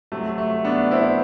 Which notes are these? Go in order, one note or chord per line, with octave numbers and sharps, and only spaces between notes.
C3 F#3 A3
A3
B3 D4
C4 E4